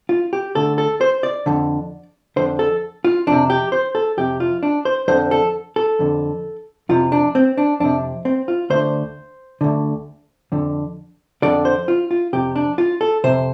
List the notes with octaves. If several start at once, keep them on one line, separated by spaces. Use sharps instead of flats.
F4
G4
D2 D3 A4
A4
C5
D5
F2 D3
F2 D3 C5
A4
F4
F2 C3 D4
G4
C5
A4
F2 C3 G4
F4
D4
C5
F2 D3 C5
A4
A4
F2 D3
F2 C3 F4
D4
C4
D4
F2 C3 D4
C4
F4
D2 D3 C5
D2 D3
F2 D3
F2 D3 D5
C5
F4
F4
F2 C3 G4
D4
F4
A4
F2 C3 C5